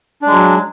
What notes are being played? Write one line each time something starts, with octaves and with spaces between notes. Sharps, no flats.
F#3 G#3 D4